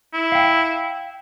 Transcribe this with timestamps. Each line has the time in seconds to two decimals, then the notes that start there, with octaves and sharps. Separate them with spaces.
0.14 E4
0.32 F5 G5